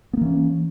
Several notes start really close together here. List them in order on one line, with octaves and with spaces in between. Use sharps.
B3 A#3 E3 C#4